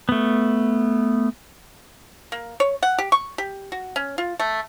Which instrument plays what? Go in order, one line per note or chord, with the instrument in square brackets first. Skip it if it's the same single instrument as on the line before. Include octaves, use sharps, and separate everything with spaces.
[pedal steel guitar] A3 B3
[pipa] A#3
C#5
F#5
G4
C#6
G4
F#4
C#4
F4
A3